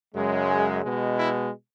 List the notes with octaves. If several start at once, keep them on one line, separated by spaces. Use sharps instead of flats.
F#2 C#3 G#3
G#4
B2 G#3
E4